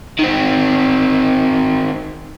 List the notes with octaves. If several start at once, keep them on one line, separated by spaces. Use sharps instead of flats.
D#3 C4